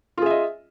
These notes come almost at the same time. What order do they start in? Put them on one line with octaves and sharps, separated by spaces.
F4 G#4 E5 D#5